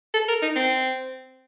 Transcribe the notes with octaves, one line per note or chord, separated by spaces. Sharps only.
A4
A#4
D#4
C4